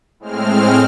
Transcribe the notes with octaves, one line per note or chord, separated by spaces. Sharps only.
A2 G#3 C4 F6